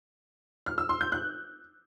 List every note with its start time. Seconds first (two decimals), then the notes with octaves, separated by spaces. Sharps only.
0.66 F6
0.78 E6
0.89 C6
1.01 G6
1.12 F#6